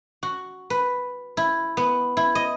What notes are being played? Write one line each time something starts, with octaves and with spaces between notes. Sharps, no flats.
F#4
B4
E4
B3
E4
D#5